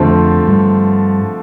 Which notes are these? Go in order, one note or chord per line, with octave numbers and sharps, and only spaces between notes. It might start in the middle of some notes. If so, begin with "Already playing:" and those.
Already playing: F2 D3 F3 A3 C4
G2